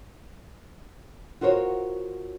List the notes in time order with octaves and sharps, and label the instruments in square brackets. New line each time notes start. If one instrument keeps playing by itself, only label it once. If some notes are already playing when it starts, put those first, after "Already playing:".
[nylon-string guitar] F4 F#4 A#4 C5 C#5